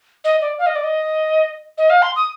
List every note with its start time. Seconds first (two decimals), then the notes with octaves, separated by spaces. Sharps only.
0.24 D#5
0.41 D5
0.58 F5
0.66 D#5
0.75 D5
0.83 D#5
1.78 D#5
1.90 F5
2.02 C6
2.16 D#6